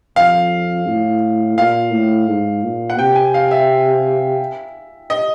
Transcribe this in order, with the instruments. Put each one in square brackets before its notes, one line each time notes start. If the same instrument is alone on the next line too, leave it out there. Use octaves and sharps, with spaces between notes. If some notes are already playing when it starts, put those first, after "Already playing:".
[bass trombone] F2 [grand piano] F5
[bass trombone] A2
[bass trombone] A#2 [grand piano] F5
[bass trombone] A2
G#2
A#2
[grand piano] F#5
[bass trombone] C3 [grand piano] G5
[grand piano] G#5
F5
E5
D#5